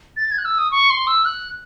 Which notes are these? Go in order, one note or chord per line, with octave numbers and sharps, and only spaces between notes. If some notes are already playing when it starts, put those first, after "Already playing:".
A6
G#6
F#6
E6
D#6
C#6
C6
E6
F#6